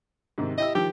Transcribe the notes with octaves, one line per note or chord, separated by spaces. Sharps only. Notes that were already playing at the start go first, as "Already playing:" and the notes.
G#2 C3 D#3
E4 G4 D#5 E6
D#3 F3 G4